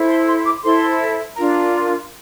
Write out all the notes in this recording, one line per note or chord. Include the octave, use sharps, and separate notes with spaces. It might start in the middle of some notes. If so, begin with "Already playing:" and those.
Already playing: E4 A4 C5
C6
C6
D6
E4 A4 C5 C6
D4 F4 A#4 A#5